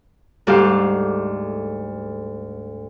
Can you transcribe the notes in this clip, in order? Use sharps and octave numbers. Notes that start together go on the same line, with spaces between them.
D2 G#2 G3 G4 A4 F5